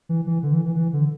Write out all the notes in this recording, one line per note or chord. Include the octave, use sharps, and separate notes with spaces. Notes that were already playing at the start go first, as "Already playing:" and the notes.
E3
E3
D3
E3
E3
E3
D3